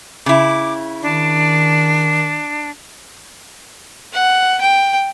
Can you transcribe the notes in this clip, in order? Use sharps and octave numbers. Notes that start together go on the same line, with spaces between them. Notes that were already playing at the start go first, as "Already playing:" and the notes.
C#3 E4 D6
D#3 D4
F#5
G5